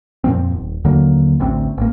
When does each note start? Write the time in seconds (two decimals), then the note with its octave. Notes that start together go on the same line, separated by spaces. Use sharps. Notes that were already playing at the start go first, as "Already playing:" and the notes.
0.24 F2 A#2 F3 C4
0.52 D#1
0.84 D#2 D3 F#3 A#3
1.40 A1 D2 C4
1.77 A1 A#3